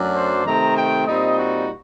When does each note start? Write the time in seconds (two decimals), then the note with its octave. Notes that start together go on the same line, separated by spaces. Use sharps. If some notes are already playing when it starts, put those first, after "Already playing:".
Already playing: F#2 F#3 A3 D4
0.14 C5
0.44 C3 D#3 A3 C4 D#4 A#5
0.76 G5
1.07 A#2 G3 C4 D#4 D#5
1.37 F#4